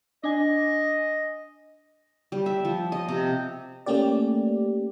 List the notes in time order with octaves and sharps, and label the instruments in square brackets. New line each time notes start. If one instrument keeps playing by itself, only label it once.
[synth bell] D4 G#5 [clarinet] D#5
[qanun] G3
E5
F3
D#5
C3
[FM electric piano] A3 A#3 C#4 G4 D5